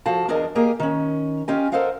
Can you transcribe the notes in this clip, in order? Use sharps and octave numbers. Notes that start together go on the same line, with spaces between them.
F3 F#4 A4 F5 A5
E2 D4 G#4 A#4 D#5
A#3 G4 G#4 A#4 D#5
D#3 C#4
C#4 F4 G4 D#5 G#5
A4 A#4 C5 D#5 F5 F#5